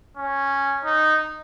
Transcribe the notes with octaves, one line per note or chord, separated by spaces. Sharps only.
C#4
D#4